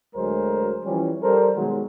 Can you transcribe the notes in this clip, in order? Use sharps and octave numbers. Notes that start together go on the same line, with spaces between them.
D2 F#3 G#3 A#4 C5
E3 F3 G3 C#4
G3 A4 A#4 C5
B2 D#3 F#3 G#3